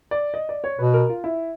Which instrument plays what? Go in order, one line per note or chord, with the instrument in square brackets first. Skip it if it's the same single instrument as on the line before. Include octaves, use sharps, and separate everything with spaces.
[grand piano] D5
D#5
D5
C#5
[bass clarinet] B2 [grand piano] B4
[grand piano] A#4
F4
E4